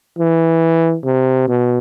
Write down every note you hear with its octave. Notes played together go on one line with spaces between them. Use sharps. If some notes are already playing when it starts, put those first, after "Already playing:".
E3
C3
B2